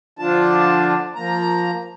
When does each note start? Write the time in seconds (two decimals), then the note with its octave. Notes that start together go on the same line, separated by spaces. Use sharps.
0.19 D3 F3 D4 F4 A5
1.15 F3 A#3 A#5